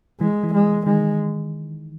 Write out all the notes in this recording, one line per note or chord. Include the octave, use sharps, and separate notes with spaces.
E3 G#3
E3
G#3
D#3 G#3